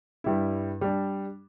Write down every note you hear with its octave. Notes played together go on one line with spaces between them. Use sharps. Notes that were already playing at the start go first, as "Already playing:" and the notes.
G2 G3 E4
G3 D4